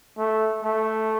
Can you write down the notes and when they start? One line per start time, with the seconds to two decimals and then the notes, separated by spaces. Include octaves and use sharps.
0.18 A3
0.63 A3